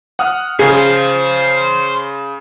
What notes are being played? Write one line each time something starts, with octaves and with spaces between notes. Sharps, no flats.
F#5 D#6 F6
C#3 G#4 C5 F5